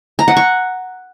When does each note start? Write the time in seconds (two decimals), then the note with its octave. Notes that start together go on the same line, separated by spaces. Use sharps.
0.19 A#5
0.28 F#5
0.37 C#6